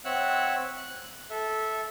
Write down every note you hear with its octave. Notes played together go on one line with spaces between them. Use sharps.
C4 C#5 E5 F#5 E6 F#6
F#6
A4 E5